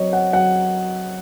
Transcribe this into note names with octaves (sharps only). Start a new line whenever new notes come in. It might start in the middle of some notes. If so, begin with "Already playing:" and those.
Already playing: F#3 C4 C#5 D#5
F#5
F#3 F#5